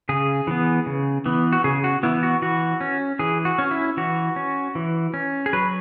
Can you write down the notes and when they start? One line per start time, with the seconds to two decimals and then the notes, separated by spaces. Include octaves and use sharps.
0.09 C#3 G#4
0.47 E3 B3
0.86 C#3
1.26 E3 B3
1.53 F#4
1.64 C#3 G#4
1.84 F#4
2.03 E3 B3 E4
2.23 F#4
2.42 E3 F#4
2.81 C#4
3.19 E3 G#4
3.45 F#4
3.59 C#4
3.71 E4
3.97 E3 F#4
4.36 C#4
4.75 E3
5.14 C#4
5.46 G#4
5.53 F#3 B4